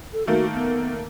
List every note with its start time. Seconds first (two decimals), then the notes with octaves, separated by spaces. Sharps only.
0.13 A4
0.27 D#3 A3 A#3 F#4
0.54 B3